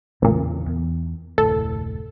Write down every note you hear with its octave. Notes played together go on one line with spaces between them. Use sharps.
A1 E2 A#2 C#3 E3
E2
F1 D2 A2 A4